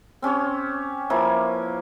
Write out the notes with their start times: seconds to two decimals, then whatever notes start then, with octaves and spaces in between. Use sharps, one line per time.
0.22 C4 C#4 G4 C#5
1.10 F3 A#3 E4 B4